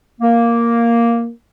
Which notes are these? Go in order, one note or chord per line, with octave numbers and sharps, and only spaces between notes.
A#3